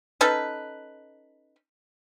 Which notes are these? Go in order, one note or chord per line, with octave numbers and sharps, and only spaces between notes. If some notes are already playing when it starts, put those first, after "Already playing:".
C#4 D#4 A4 B4